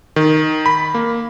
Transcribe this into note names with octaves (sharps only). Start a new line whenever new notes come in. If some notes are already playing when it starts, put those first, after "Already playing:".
D#3
B5
A#3